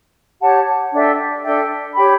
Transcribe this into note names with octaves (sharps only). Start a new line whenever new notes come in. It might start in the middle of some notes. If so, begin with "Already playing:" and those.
G4 C#5 F#5 A5
D4 A4 E5 G5
D4 A4 E5 G5
G4 C#5 G5 B5